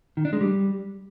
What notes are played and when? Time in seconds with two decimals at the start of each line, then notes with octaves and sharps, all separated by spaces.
0.17 D#3
0.25 D4
0.33 G#3
0.41 G3